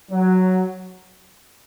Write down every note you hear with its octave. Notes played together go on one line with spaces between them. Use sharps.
F#3